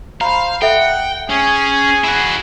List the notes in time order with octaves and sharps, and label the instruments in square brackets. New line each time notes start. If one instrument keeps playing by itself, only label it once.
[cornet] C5 [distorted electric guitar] F5 [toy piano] A#5 B5
[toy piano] A4 E5 [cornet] F#5 [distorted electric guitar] G5
[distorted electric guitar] C#4 [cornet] G#4
[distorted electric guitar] E4 F#4